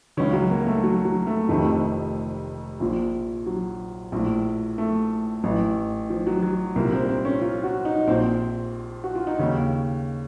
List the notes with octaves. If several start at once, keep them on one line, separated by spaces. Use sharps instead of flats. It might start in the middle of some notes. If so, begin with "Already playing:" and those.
C#2 C#3 C#4
F#3
A#3
A3
F#3
F#3
A3
F1 F2 C3 D#3 A3
A#1 A#2
F#3
A#1 A2
A3
A1 A2
F3
F#3
F#3
C2 A#2 A#3
C4
C4
C#4
F4
F#4
D#4
A#1 A#2 C4
F#4
F4
D#4
D#2 C#3 C#4